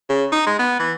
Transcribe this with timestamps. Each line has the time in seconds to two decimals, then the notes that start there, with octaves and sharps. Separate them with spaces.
0.09 C#3
0.32 D#4
0.47 G#3
0.59 B3
0.80 E3